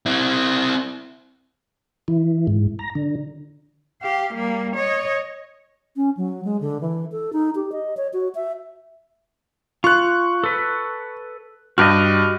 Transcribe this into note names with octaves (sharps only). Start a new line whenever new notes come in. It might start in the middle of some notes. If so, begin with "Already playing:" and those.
C4 E4
E3
G#2
A#5
D3
G4 F5
G3 A#3
C#5 D#5
C#4
F#3
G#3
D3
E3
A4
D#4
G4
D#5
C#5
F#4
E5
F4 C#6 F#6
A4 B4
G2 F#4 G4 D#5 F6